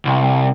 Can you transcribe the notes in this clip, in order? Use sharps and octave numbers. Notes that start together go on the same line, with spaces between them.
C2